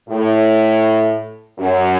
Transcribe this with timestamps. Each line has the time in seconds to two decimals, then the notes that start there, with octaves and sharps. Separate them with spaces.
0.08 A2
1.58 F#2